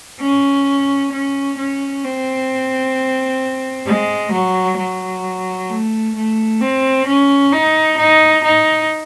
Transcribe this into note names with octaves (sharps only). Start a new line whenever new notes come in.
C#4
C#4
C#4
C4
G#3
F#3
F#3
A3
A3
C4
C#4
D#4
D#4
D#4